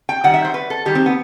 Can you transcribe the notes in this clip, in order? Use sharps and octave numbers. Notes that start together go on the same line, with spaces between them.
G5
D#3 G3 F#5
E5
C5
B4
A4
D#3 G3 G4
C4
B3